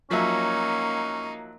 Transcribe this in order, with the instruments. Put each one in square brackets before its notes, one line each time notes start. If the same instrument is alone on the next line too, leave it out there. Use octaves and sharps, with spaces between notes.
[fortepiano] F3 F#3 E5 [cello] A#3 [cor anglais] C#4 [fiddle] D#4